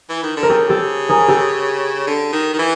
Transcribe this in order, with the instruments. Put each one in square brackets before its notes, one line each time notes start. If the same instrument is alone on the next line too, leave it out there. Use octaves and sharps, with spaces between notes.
[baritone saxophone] E3
D#3
D3
[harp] A#4
[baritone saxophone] C#3 [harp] G4 A4
[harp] G4 A4
G#4 A#4
G4 A4
[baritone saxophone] D3
D#3
D#3
E3